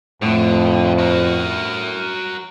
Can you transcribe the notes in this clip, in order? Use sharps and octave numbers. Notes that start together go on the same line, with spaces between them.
F2 A2 D3 A3 E7
F#4 A#4